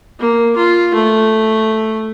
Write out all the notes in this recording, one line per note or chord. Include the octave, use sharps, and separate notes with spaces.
A#3
F4
A3